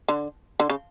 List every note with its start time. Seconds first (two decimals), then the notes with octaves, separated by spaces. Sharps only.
0.08 D3
0.60 D3
0.70 C#3